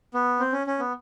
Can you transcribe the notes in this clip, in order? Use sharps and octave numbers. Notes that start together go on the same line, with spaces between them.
B3
C4
C#4
C#4
B3